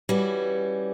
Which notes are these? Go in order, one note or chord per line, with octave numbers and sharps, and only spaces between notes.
E3 G3 C#4 F#4